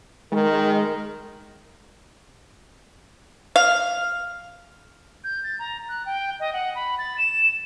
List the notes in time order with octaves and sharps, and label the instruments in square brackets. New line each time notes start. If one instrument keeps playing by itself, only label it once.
[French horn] D#3 [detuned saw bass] G#3 [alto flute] A#4
[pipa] F5
[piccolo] G6
A6
A#5
F#6
G5
D#5
F#5
B5
A6
E7